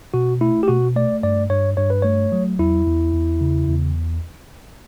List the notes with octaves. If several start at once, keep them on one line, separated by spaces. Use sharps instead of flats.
B2 F#4
A3 E4
G4
B2 F#4
A3 D5
G2 D5
G2 C#5
G2 C#5
B4
A3 C#5
F#3
E2 E4
E2
E2
C#3
E2